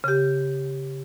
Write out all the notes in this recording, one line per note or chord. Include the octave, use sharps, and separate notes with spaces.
C#3 G4